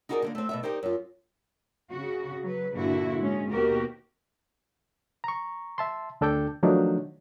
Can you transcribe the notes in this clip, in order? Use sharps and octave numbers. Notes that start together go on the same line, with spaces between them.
D#4 E4 F#4 G#4 A#4 D5
D3 A3 A#3
A3 C4
B2 A3 E5
D#4 G4 A#4 C5 D5
F#2 F4
C#3 F#4
F#3 B4
G2 A#2 D3 E4 F#4
G#2 G#3 C#4
D#2 B2 F#4 G4 A#4
A#5 C#6
E5 A5 C6
D2 D4 A4 G5 D6 G6
D#3 F3 F#3 A3 D4 D#4